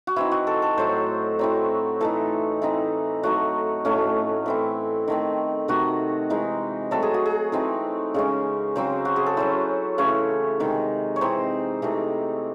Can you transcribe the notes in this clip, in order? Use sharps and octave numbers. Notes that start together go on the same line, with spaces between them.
F#4
E3 C4 D#4 E4
F#4
A4
A4
A2 F#3 A3 C5
F#3 C4 E4
E3 A3 D#4 A4
E3 C4 D#4
F#3 A3 D#4 F#4
A2 F#3 A3 C#4
E3 C4 E4
D#3 A3 C4
C3 D#3 A3 D#4 F#4
E3 G#3 D#4
F#3 A3 C4 A4
G#4
F#4
G#4
E3 A3 C4 D#4
C#3 G#3 C#4
C#3 F#3 C4 C5
F#4
G#4
A4
F#3 C#4 E4 C5
C#3 E3 A3 C#5
C3 D#3 G#3
C#5
E3 C4 D#4 C5
C3 E3 A3 D#4